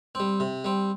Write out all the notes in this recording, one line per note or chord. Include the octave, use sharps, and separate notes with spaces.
G3 C4
C3
G3 C4